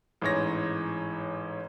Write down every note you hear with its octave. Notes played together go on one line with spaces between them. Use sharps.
A1 G#2 C#5 A#6